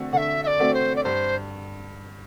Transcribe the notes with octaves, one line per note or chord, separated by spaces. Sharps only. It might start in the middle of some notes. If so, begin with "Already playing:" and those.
Already playing: D3 A3 C4 F#4
D3 E5 F#5
E5
D5
A3 C4 F#4
C5
D5
G2 C5